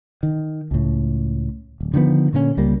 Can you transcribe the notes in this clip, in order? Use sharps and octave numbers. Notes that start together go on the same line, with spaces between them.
D#3
C#2 A2
D1
D3 D#3 F3 B3
A#2 D3 D#3 C#4
C#2 G3 A#3